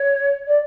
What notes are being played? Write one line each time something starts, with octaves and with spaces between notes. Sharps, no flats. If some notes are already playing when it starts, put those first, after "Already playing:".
Already playing: C#5
D5